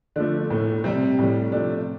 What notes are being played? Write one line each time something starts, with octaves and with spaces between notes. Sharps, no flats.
D3 F3 A3 D4
A2 A3
C3 G3 C4
A2 G3
C3 F3 A3 D4